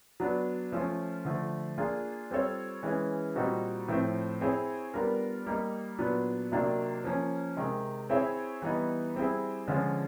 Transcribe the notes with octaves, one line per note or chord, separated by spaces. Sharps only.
F#3 B3 D4
F3 A3 C#4 F4
D3 F3 A3
A#3 D4 F4 G#4
G3 C4 F4 A4 C#5
E3 G#3 C#4
A#2 G3 C4 D#4 F#4
A2 F3 A3 C4
C4 E4 G#4 C#5
G3 B3 D4 F4 A#4
G3 A#3 D#4 G4
A#2 F#3 B3 D4
C3 D#3 F#3 A#3 D4
F3 A#3 C#4
C3 D#3 G#3
C4 E4 G#4 C#5 E5
E3 G3 B3 D#4
G3 C4 E4 G#4
D3 F3 G#3 C#4 F4